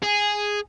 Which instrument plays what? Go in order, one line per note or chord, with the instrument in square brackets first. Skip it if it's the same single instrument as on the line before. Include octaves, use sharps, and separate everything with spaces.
[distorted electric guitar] G#4